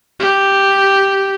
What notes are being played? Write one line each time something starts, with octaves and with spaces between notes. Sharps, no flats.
G4